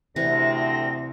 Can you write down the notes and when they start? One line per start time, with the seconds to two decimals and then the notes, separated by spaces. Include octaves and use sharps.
0.16 D2 C3 E3 C4 B4 A#6